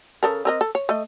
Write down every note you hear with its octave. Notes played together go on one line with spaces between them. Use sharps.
C#3 A4 A#4
C4 A#4 D#5
A4
C#5
A3 D#5